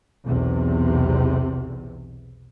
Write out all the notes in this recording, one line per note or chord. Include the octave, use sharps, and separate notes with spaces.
B1 E2 C3